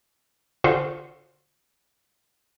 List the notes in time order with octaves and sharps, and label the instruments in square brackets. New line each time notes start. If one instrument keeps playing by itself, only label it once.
[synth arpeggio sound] D3 F4 F#4 C5